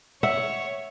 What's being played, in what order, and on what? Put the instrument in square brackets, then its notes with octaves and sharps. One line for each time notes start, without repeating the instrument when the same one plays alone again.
[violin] C#5 [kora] E5 [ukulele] F#5